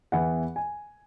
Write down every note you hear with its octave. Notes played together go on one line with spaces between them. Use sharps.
E2 E3 B3 F#5
G#5